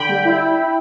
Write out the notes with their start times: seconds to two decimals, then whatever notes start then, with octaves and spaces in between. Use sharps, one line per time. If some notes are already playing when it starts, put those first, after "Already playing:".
Already playing: D3 G5 B5
0.09 G3
0.25 E4